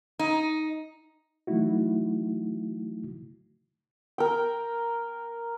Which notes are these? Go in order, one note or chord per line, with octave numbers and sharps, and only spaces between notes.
D#4
E3 F#3 A3 D#4 E4 F#4
A#4 G5